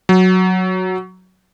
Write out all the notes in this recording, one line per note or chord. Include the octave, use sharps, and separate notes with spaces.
F#3